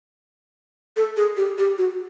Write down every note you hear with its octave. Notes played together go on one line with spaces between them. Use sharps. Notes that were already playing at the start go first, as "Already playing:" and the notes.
A4
G#4
G4
G4
F#4